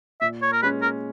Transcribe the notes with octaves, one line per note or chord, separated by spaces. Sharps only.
A#2 E5
C#5
A#4
G#3 C#4 B4
A#4